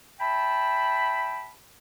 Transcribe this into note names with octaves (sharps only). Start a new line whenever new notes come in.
E5 G5 A5 B5